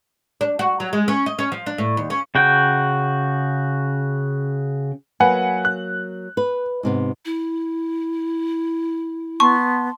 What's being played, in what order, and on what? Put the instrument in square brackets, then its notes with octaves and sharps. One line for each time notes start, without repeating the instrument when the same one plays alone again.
[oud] D4
F#4
F#3
G#3
C#4
D#5
C#4
F3
D4
A2
D#2
C#4
[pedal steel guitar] C#3 F#4 G5
[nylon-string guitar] F#3 A#3 [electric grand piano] B4 F#5 G#5
[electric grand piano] F#6
[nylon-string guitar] B4
G#2 C3 B3
[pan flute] E4
[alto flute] B3 [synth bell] A5 C6 [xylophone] C#6